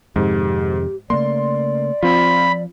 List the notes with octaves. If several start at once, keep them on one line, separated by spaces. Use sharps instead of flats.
F2 G#2 C3 D#3 G4
C#3 A3 A#3 D5 C6
F3 C4 F4 B5